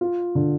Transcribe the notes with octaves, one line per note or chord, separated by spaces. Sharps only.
F4
D3